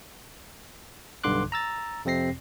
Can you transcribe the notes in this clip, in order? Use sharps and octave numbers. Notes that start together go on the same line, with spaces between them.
B1 G2 D3 C6 D6 F#6
A#5 E6 A6
F2 C3 C4 A#6 C7